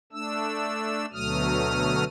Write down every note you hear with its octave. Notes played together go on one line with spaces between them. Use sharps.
A3 D4 E6
D2 B2 F#3 A3 D#6 F6